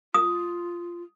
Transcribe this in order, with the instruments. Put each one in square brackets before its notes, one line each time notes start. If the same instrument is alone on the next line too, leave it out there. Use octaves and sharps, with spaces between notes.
[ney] F4 [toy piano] D#6